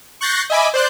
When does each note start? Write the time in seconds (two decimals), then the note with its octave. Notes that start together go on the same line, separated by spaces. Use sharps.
0.21 C#6 F#6 G6 A6 A#6 C7
0.50 D#5 E5 G#5 B5 D6
0.74 C5 D5 F#6 G6